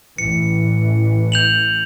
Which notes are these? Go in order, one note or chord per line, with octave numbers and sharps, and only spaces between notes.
A1 A2 E3 C#7
G6 F7 F#7